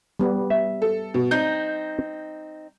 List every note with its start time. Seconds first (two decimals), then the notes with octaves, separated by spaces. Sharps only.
0.19 G3 B3
0.50 E5
0.82 A4
1.14 B2
1.31 C4 D#4 G6